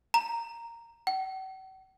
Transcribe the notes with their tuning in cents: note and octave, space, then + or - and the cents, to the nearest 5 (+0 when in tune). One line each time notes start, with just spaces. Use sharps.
A#5 -5
F#5 +45